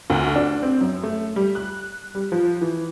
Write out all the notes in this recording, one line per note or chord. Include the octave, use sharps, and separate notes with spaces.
D2
D4
C4
F#2
A3
G3
F#6
G3
F3
E3